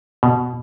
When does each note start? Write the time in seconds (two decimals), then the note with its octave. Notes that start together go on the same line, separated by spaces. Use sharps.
0.23 B2